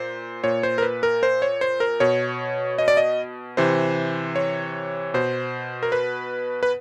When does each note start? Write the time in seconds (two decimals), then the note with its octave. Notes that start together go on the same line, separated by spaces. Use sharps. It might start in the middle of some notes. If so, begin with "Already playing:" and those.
Already playing: A#2 C5
0.44 A#2 C#5
0.63 C5
0.78 A#4
0.82 B4
1.03 A#4
1.23 C5
1.42 C#5
1.61 C5
1.80 A#4
2.00 B2 C#5
2.78 D#5
2.88 D5
2.97 D#5
3.57 C3 E3 C5
4.35 C#5
5.14 B2 C5
5.83 A#4
5.92 B4
6.63 B4